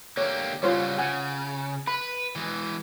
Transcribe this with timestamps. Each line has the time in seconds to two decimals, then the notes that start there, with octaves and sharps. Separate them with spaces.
0.17 D3 A#3 G4 C#5
0.63 C#3 F#3 G3 F4 C5 C#5
0.98 C#3 F#5 G#5
1.88 B4 B5
2.36 E3 G#3